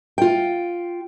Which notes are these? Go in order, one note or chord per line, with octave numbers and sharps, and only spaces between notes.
F4 G5